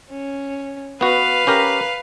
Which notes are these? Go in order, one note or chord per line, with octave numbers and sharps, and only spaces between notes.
C#4
B3 F#4 B4 F5
C#4 G4 A#4